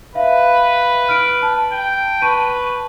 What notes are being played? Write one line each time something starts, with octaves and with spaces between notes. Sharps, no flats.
B4 E5 F5
F6 D7
A5
G5
B4 A5 C#6 D#7